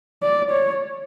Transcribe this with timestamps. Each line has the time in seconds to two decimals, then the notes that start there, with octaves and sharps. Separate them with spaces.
0.23 D5
0.51 C#5